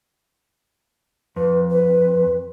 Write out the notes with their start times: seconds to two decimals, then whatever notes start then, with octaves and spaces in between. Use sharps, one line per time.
1.36 F2 B4
1.69 B4